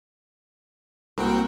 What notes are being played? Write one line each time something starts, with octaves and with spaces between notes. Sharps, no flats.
C2 A#3 C4 F#4 A#4 G5